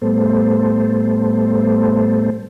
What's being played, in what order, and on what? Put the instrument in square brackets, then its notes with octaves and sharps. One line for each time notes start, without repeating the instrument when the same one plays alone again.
[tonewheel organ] A2 G3 A3 B3 A4 C5